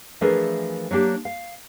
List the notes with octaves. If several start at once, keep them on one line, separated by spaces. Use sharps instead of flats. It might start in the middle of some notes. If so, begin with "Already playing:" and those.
E3 F3 A3 D4 G#4 A#4
F#3 A#3 D4 G4
F5